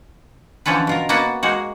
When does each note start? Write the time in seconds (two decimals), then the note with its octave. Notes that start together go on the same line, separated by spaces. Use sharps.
0.66 D3 E3 F3 C#4 A4 B4
0.87 B2 F4 A#4
1.09 A#3 B3 F#4 D#5 A5
1.43 G#3 A#3 D#4 F#4